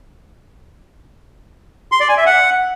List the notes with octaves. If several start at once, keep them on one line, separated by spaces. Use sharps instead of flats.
C6
D5
G#5
E5
F#5